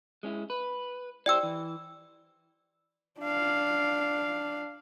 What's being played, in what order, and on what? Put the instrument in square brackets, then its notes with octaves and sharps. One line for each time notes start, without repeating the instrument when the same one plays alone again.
[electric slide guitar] G#3 C#4 E4
B4
[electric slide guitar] E4 G4 C5 [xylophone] D5 G5 E6
[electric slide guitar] E3
[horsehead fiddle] D4 F5